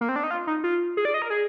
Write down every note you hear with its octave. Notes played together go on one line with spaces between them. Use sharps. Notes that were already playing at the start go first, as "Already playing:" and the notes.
A#3
C4
D4
D#4
F4
D#4
F4
G#4
D5
D#5
A#4
G#4